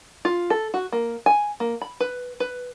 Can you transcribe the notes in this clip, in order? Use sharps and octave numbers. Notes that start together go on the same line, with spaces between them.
F4
A4
F#4
A#3
G#5
A#3
B5
B4
B4